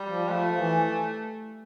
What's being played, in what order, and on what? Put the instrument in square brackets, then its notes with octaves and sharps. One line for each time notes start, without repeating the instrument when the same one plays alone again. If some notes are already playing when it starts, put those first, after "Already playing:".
Already playing: [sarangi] G3
[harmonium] F3
[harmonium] F3 [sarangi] A3
[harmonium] E3